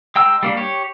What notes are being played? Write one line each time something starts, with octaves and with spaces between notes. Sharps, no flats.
G#3 G5 A#5 E6
G3 A#3 D4
G4 C#5